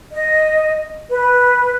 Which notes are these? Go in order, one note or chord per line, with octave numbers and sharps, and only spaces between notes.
D#5
B4